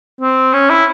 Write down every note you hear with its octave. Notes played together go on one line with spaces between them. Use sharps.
C4
C#4
E4